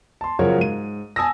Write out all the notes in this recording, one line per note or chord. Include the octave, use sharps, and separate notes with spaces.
A5 C6
C#3 F3 F#3 F#4 A#4 C#5
G#2 D#7
G#5 A5 D#6 E6 A#6